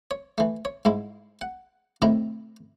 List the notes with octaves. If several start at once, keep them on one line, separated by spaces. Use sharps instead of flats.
C#5
E3 A3
C#5
G#2 G#3 E4
F#5
A2 C3 D#3 E4 A#5